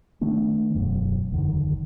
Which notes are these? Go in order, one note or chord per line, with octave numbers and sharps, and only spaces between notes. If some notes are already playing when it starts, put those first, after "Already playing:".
D#3 A3 B3 D4
E1 F#2
F#1 E2 D3 D#3